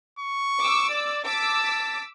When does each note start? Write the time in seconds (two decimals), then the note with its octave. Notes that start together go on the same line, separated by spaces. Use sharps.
0.19 C#6
0.59 D6 E6
0.90 D5
1.25 A5 D6 E6 B6